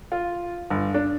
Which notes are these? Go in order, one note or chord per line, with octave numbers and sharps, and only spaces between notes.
F4
G1
D4